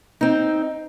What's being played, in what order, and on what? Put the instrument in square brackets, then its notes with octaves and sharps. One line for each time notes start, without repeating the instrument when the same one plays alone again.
[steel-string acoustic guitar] C4 D#4